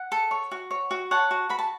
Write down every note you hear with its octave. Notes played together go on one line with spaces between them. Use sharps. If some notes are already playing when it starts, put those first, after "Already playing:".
Already playing: F#5
A4
C#5
F#4
C#5
F#4
C#5 F#5 A5
F#4
F#4 B5
A5